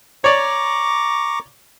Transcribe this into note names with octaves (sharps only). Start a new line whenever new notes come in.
C#5 D5 A#5 C#6 D6